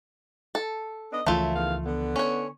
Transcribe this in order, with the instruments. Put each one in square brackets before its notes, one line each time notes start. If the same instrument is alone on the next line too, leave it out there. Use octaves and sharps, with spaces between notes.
[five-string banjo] A4
[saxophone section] B3 D4 D#5
[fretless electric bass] C#2 E3 F3 [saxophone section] F#2 C#3 E4 [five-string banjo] A3 F4
[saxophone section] E2 D#3 F5
D3 B3
[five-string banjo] C#4 C#5